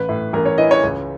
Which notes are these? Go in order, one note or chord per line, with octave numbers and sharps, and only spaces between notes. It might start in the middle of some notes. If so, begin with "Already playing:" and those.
Already playing: A1 B4
A2
A1 A#4
C#5
E3 D#5
C#5
C#2